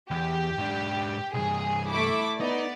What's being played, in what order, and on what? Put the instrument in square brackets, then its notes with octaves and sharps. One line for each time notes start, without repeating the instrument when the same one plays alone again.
[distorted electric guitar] E2 [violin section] G4
[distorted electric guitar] G#2 D4
[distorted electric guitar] C2 G2 [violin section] G#4
[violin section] A3 E4 D6
[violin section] B3 D5 [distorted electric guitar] D#4